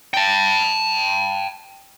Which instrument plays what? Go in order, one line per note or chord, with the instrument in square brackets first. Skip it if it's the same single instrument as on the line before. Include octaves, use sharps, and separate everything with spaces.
[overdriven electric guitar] G5 A5